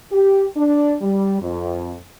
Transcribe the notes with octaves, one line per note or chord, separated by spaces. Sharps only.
G4
D4
G3
F2